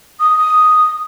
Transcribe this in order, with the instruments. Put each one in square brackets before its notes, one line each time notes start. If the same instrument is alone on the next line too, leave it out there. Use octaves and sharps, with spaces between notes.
[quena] D#6